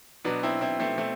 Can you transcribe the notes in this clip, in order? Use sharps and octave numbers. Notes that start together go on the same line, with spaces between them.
B2 F#3 B3 D4
C4 E4
C4 E4
A3 C4
B2 A3 C4